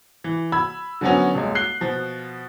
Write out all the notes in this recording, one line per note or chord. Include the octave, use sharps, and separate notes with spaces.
E3
B5 E6 G#6
D3 F3 F#3 B3 C#4
D#1 G#3
F#6 C7 G7
B2 F3